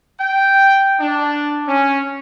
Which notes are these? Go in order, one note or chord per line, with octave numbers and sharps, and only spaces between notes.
G5
D4
C#4